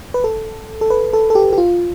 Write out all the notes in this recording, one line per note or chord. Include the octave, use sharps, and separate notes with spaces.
B4
A4
A4
B4
A4
A4
G4
G4
F4